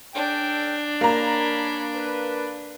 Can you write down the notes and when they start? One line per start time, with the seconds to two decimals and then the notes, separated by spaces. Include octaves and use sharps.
0.15 C#4 D4 A4 G5
1.01 A#3 C#5 G#5 A#5 B5
1.95 B4